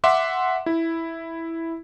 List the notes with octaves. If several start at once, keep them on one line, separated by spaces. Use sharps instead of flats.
E5 F#5 C6 D6
E4